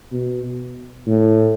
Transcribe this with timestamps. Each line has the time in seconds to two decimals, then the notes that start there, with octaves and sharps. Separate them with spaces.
0.12 B2
1.07 A2